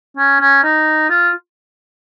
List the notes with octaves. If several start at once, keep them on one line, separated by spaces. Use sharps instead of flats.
C#4
C#4
D#4
F4